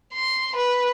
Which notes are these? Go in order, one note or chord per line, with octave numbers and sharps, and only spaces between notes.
C6
B4